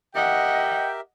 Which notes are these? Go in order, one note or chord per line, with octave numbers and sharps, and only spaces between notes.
G4 A#4 D#5 E5 F#5 G5